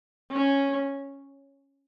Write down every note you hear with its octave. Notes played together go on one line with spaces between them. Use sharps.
C#4